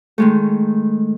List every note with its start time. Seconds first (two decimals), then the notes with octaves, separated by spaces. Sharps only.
0.18 D#3 G#3 A3